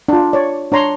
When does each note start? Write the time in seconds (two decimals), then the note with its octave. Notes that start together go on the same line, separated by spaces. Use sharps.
0.09 D4 F4
0.33 C#5 D5
0.72 D4 C#5 A#5 C6